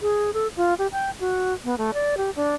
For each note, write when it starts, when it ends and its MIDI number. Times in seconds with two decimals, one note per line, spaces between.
0.01 0.31 68
0.34 0.48 69
0.57 0.74 65
0.79 0.87 67
0.92 1.10 79
1.20 1.54 66
1.64 1.75 59
1.78 1.91 57
1.94 2.15 74
2.17 2.30 67
2.36 2.55 62